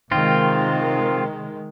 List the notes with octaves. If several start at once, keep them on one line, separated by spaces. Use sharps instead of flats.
C3 D#3 G#3 C4 F4